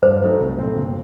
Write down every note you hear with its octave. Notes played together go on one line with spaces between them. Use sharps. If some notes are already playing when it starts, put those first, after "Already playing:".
G2 C5
F#3 A3 D#4
C2
A#2 A3 C4
G1